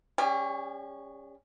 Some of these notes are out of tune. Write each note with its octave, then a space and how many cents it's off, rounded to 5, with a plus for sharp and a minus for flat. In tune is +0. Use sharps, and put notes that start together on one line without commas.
G3 +0 C#4 +0 G#4 -45